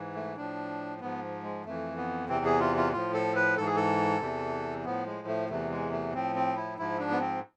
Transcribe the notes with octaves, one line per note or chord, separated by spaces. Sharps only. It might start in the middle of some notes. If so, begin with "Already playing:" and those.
Already playing: G#2 E3
A3
A2 F3 D4
G#2 F3 B3
G#3
F2 E3 A3
B3
E2 C3 E3 C4
G#4
F4
F4
A2 F3 F4
A4
B4
G#2 E3 A4
G#4
A4
E2 C3 E3
A2 F3 B3
G#3
A3
E2 C3 E3 A3
G#3
A3
A2 F3 C4
C4
E4
G#2 F3 E4
D4
B3
C4